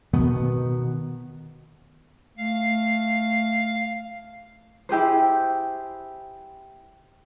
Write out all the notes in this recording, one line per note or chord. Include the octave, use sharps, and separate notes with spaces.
B2 D#3 B3
A3 F5
E4 G4 G#4 C5